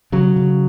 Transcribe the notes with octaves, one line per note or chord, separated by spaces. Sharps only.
C#3 F#3
C#3